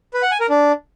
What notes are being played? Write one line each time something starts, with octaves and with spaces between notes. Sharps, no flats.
B4
F#5
G#5
A#4
D4